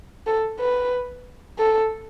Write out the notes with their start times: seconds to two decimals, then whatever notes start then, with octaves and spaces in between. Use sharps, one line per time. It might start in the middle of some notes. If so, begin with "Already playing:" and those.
0.27 A4
0.60 B4
1.58 A4